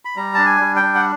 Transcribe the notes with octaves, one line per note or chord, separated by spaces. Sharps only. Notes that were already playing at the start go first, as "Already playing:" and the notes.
B5
G3 A#5
D4 A5
G#5
G3
G5
D4
F#5